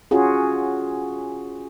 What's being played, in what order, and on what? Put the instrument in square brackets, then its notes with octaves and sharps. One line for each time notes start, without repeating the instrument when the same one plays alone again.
[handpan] C#4 F4 F#4 G#4